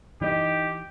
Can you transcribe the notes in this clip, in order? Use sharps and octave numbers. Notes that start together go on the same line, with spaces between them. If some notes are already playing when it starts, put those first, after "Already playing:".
E3 D#4 G4 D#5